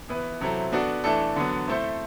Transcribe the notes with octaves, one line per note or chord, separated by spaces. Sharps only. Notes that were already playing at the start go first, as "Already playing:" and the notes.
E3 B3 E4 B4
C3 F#3 C4 E4 A4
B3 D4 F#4 A4
E3 A3 D4 A4
D3 F#3 B3
A3 C4 E4 A4 C5